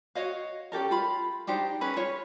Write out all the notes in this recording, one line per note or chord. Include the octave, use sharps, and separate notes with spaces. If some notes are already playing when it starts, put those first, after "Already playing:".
F#4 C#5 D#5 F5
C#4 G4 A4 A#4
F4 B5
D4 D#4 G4 C5
C#4 G#4 B4 B5
F4 C#5